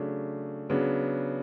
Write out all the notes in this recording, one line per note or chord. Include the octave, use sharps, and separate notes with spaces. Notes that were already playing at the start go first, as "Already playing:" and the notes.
Already playing: C#3 F#3 A3 D4
C#3 F#3 B3 D4